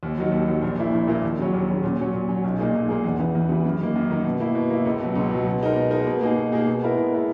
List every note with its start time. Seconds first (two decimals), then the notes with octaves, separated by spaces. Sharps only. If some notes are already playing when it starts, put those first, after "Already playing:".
0.03 D#2
0.18 D#3 F#3
0.32 D#2
0.48 D#3 F#3
0.62 A#1
0.77 A#2 A#3 E4
0.93 A#1
1.07 A#2 A#3 E4
1.23 D#2
1.38 C#3 F#3 C#4
1.53 D#2
1.68 C#3 F#3 C#4
1.83 A#2
1.99 F#3 C#4
2.14 A#2
2.29 F#3 C#4
2.44 B1
2.59 A#2 A#3 D#4 G#4
2.73 B1
2.89 A#2 A#3 D#4 G#4
3.04 E2
3.20 C#3 E3
3.35 E2
3.49 C#3 E3
3.65 F#2
3.80 D#3 A#3
3.95 F#2
4.11 D#3 A#3
4.24 B2
4.40 A#3 E4
4.55 B2
4.70 A#3 E4
4.85 C#2
5.00 B2 F#3
5.16 C#2
5.31 B2 F#3
5.46 B2
5.61 G#3 D#4 A#4
5.76 B2
5.91 G#3 D#4 A#4
6.07 B2
6.21 A#3 D#4 G#4
6.37 B2
6.52 A#3 D#4 G#4
6.67 B2
6.82 G#3 B3 E4 A#4
6.97 B2
7.12 G#3 B3 E4 A#4